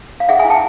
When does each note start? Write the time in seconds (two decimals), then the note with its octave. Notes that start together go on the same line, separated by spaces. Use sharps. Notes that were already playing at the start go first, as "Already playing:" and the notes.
0.20 F5
0.29 G#4 E5 F#5
0.39 F#5 G#5
0.45 E4
0.50 G5 A5